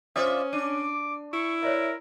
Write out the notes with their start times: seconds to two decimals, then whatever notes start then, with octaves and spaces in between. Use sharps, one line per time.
0.16 C#4 F4 C5 D5 E5 D#6
0.53 D4 D6 D#7
1.33 E4 C#6
1.63 A#4 C#5 D5 E5